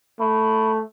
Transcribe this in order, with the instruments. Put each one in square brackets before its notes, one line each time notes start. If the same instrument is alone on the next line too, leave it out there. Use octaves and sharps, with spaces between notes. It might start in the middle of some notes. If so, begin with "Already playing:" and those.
[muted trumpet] A3 [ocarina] B5